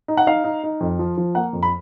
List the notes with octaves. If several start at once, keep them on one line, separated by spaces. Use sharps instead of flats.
D#4
F#5
D#4 F5
D#4
D#4
F2
F3
F3
A#3 F#5
F2
B5